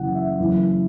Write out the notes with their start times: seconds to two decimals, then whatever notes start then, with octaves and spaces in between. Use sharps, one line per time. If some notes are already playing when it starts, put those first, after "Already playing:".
Already playing: F#1 F#2 C#3 E3 F#5
0.15 E5
0.38 F#1 F#2 E3